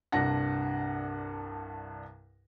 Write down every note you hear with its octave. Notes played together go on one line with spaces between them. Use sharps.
C2 G2 D4 F#5 A#6